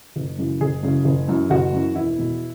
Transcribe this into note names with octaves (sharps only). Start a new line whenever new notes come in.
F#1
F#2 C#3 E3
F#1 G#4
F#2 C#3 E3
F#1
F#2 E3
F#1 F#4
F#2 E3
E1 E4
E2 B2